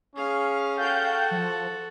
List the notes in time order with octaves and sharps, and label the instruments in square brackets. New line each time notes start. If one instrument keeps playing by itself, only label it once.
[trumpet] C#4 [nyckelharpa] G#4 F5
[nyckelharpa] F#4 A4 [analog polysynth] F5 G5 G6
[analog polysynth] F3